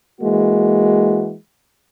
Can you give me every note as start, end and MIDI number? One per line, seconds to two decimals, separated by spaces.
0.21 1.34 52
0.21 1.34 56
0.21 1.34 58
0.21 1.34 66